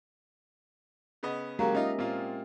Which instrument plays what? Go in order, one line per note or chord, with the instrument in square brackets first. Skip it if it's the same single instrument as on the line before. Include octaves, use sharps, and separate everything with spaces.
[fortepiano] C#3 B3 D#5
[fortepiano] C#3 F#3 [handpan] G#3 A#3 G4 [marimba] A#4 F5 A#5
[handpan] C#4 D#5 E5 [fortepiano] D#4 F4
[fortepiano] A#2 F4 [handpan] C4